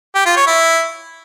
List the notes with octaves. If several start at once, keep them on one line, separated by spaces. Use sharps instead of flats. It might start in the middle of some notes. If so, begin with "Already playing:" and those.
G4
F4
C#5
E4